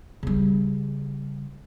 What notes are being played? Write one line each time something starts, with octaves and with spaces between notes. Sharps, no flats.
C#3 G3